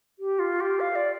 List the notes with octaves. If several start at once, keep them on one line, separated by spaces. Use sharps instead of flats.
G4
F4
G4
F5
D5